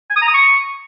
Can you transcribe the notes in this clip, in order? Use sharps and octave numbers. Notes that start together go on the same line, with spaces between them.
G#5
D#6
A#5
D#6
C#6